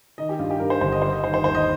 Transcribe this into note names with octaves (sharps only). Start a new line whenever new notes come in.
D#3 D#5
G4
G2 F4
G4
G2 A#4
C5
G1 C5
D#5
G3 C5
D#5
D#3 C5
C5
D#2 C5
D#5